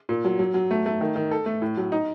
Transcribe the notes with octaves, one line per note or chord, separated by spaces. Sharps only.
A#2
F#3
F#3
F#3
A3
A3
D#3
D#3
A4
A3
A2
F#3
D#4